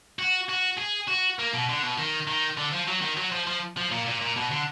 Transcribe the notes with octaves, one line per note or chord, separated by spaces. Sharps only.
F#4
F#4
G#4
F#4
A#3
B2
D3
B2
D#3
D#3
D3
F3
F#3
D#3
F#3
F3
F3
F3
A#2
A#2
A#2
B2
D3